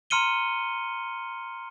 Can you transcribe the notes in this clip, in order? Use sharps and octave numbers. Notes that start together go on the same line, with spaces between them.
A#5 C6 F6 C#7 D#7 G7